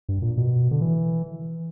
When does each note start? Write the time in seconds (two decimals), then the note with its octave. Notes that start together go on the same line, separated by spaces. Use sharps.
0.09 G2
0.22 A#2
0.37 B2
0.71 D3
0.81 E3